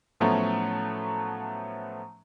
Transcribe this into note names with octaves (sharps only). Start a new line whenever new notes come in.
A2 F3 F#3 A3 B3 C#4